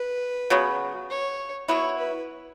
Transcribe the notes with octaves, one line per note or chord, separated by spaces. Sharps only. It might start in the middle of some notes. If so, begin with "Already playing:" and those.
Already playing: B4
C#3 F#3 B3
C#5
F#3 B3 E4 C#5
B4